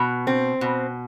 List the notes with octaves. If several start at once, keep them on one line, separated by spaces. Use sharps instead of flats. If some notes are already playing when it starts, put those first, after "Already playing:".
Already playing: B2
C4
B2